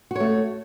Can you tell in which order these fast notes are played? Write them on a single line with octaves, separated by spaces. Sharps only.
F#4 C#5 A3